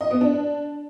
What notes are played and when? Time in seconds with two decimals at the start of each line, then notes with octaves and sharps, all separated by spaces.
0.01 D#5
0.11 B3
0.21 D4